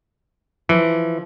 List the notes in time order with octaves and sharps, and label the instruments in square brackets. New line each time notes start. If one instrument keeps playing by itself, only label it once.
[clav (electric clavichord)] E3 [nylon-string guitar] F3